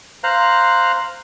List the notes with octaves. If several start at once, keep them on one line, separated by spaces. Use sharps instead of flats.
C5 F5 A#5 F#6